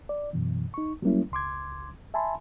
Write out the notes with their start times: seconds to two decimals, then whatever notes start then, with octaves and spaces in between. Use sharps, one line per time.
0.09 D5
0.33 F#2 B2 E3
0.74 D#4 C#6
1.02 F#3 G3 A3 A#3 C#4 E4
1.32 C#2 C6 D6 G#6
2.14 E5 G#5 A5 B5 C6